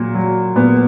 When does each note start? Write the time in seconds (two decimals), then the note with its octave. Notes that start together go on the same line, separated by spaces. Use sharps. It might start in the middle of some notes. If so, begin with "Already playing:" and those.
Already playing: A#2 F#3
0.15 F#3
0.56 A#2 B3